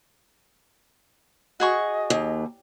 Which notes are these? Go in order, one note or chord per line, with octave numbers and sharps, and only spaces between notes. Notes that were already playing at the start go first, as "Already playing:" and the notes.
F#4 G#4 D#5 C#6
D#2